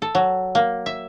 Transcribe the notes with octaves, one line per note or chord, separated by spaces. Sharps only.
A4
F#3
A#3
E5